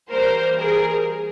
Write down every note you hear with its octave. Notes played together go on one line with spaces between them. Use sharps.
E3 G3 A#3 A#4 C5
G#4 A#4